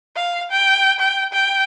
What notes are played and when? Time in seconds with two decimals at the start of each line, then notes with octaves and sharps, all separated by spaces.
0.16 F5
0.51 G5
1.00 G5
1.33 G5